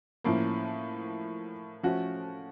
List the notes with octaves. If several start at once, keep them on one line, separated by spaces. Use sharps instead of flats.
A2 F3 A#3 C#4
F3 A3 C#4 F#4